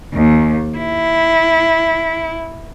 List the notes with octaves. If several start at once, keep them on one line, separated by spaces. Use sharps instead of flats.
D#2
E4